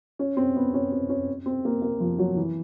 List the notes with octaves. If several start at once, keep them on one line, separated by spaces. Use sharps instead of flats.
C#4
C4
B3
C#4
C4
C#4
C4
A#3
A#3
F3
F#3
E3